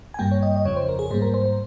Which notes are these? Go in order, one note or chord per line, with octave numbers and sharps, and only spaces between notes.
G#5
G2 G3 A#3 G5
C#5
D#5
D#5
F2 C#3 F3 C#5
C5
A#4
G#4
G#2 G3 A#3 C5
A#4
C5
C5